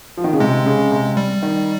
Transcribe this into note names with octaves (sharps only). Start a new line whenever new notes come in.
F3
D#3
C#3
C3 G#3
C#3
C3
G3
D#3